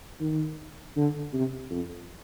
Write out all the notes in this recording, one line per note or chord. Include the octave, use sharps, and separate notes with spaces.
D#3
D3
C3
F2